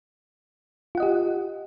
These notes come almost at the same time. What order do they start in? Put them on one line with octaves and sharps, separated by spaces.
F4 F#5 D#5 G4